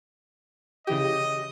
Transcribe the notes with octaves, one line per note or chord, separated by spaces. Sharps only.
C#3 E3 G4 D#5